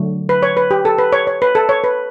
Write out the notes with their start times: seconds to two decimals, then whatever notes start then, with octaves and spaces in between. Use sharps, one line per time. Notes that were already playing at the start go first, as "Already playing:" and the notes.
Already playing: D3 F#3 A3
0.29 B4
0.43 C#5
0.57 B4
0.71 G4
0.85 A4
0.99 B4
1.13 C#5
1.27 C#5
1.42 B4
1.55 A4
1.69 C#5
1.84 B4